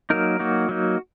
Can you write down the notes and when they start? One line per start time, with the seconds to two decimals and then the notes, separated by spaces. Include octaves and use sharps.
0.10 F#3 A#3 D#4 A#4
0.39 F#3 A#3 D#4 F#4
0.69 F#3 A#3 D#4